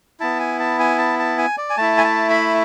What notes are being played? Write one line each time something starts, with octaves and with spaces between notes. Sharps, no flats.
B3 E4 A5
G#5
A5
G#5
A5
A5
G#5
D5
G#5
A3 E4 A5
G#5
A5
B5